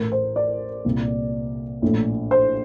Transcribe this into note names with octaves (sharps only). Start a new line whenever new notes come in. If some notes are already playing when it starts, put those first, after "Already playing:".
Already playing: A1 A2 A#4
C5
D5
C2 A#2
A#1 A2
C5